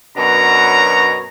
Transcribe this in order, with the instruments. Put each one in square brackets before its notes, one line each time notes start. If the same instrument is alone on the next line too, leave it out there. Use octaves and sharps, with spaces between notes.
[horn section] F#2 B2 B3 D4 C#5 A#5